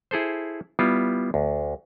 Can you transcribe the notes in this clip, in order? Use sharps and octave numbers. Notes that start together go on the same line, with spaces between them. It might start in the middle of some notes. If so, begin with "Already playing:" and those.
E4 G#4 A4 C5
G3 B3 E4 F4
D2